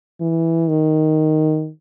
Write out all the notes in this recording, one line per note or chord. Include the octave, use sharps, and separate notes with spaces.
E3
D#3